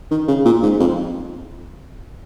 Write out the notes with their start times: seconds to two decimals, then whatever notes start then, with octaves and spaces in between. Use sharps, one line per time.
0.11 D#3
0.28 C#3
0.45 A#2
0.63 G#2
0.80 F2